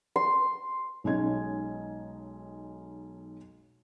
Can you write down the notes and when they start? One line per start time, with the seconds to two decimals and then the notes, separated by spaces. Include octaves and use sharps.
0.16 C6
1.04 B1 G#3 C#4 D#4 D#5 G#6